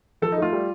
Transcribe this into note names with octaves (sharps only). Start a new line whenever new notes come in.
F3 A4
D#4
A3 F4
G3